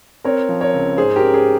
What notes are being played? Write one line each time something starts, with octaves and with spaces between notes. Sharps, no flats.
C4 A#4 C#5
F3
A#4 C#5
C#2
G#2 G#4 C5
G4 A#4
C#4
G#4 C5